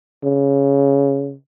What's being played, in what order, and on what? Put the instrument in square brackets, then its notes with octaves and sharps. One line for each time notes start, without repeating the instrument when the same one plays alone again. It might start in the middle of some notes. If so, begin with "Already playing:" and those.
[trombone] C#3